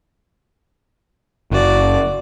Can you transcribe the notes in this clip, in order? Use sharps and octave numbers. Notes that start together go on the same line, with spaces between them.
F#1 F#4 D5